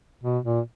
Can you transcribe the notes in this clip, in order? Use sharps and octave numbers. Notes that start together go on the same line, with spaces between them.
B2
A#2